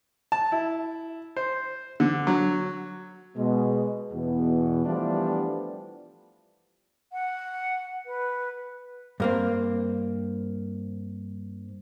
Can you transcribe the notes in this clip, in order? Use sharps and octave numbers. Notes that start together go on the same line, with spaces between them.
A5
E4
C5
D3
F#3
B2 G#3
E2 B2
E3 F3 G3 A3 B3 D4
F#5
B4
G2 A#3 C4